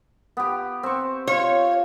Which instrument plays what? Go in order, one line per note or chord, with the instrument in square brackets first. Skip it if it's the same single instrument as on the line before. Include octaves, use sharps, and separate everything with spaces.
[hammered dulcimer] B3 G4
C4 C#6
[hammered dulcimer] F4 [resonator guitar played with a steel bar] C#5